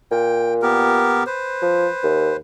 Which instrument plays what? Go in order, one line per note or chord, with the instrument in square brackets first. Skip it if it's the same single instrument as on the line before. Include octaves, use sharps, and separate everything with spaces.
[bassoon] A#2 [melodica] G5
[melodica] B3 G4 A#4
B4 C5
[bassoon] F3
D#2